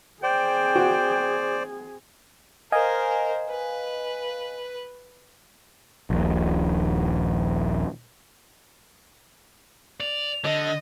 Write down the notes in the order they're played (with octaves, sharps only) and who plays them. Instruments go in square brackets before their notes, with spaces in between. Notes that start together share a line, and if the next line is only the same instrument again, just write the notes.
[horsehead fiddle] C4 G#4 [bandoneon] C5 D5 [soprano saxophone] G5
[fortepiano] F#4
[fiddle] A#4 C5 [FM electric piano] D#5 F5 G#5
[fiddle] B4
[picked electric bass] D#1 A#1
[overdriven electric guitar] D5 [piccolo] F7
[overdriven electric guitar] D3 [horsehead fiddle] D#5